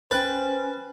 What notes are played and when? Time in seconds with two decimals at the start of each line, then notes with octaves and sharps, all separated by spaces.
0.11 C#4 B4 C5 G5 F#6 A6